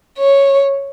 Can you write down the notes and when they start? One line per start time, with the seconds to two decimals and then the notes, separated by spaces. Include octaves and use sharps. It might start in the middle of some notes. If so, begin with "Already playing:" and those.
0.18 C#5